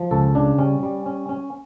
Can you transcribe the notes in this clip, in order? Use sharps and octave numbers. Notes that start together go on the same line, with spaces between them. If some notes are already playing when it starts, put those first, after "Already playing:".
Already playing: F3
C#2 A4
C#3 D4
G3 C#4
G3
C#4
C#4